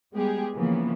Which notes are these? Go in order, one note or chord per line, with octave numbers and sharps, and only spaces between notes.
G3 G#3 B3 G4 G#4
C#3 E3 F3 A#3 B3